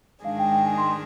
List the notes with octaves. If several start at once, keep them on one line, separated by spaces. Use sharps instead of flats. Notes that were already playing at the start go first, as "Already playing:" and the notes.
G#2 D#3 G#3 D4 G#4 F5
G5
G5
G#5
C6